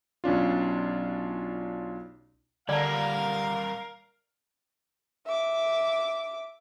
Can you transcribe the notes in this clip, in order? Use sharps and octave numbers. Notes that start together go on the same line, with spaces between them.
B1 C#4 D4 F4
D3 G3 A#3 A#4 D5 F5 A5
E5 D6